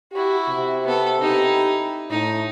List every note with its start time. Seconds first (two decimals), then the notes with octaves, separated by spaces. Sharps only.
0.13 E4 F#4 G4
0.49 C3
0.85 B3 A4
1.22 D#4 E4 G4
2.11 A2 D#4